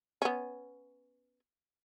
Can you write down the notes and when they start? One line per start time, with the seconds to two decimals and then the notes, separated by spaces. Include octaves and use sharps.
0.22 B3 C#4